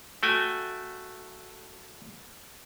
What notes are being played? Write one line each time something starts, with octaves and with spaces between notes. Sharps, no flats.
A3 F#4 G5 G#5